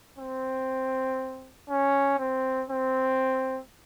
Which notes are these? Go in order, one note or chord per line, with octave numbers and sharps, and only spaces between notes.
C4
C#4
C4
C4